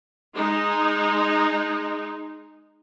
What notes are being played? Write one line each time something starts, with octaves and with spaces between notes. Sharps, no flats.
G#3 D#4